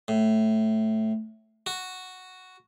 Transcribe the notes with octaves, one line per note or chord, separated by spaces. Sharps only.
A2
F#4